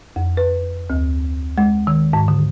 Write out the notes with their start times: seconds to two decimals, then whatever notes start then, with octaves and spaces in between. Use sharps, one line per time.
0.16 F2
0.37 B4
0.90 D2
1.58 G#3
1.87 D#3
2.13 G#2
2.28 D3